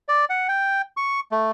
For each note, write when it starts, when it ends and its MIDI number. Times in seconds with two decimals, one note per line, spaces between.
0.09 0.25 74
0.30 0.47 78
0.49 0.82 79
0.97 1.20 85
1.32 1.51 57